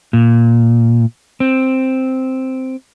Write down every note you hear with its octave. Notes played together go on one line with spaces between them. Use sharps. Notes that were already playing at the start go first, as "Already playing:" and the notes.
A#2
C4